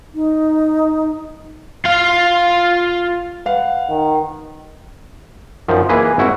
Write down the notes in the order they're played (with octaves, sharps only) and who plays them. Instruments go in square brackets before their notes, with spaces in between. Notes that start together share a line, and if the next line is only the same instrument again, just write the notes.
[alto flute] D#4
[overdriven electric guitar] F4 F5
[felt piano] B4 F5 F#5
[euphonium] D#3
[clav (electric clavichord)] F#2 D#3 F3
E3 A#3 G#4 B4 D#5
G#1 E4 F#4